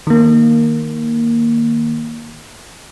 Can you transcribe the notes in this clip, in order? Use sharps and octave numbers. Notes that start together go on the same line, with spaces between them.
D#3 A#3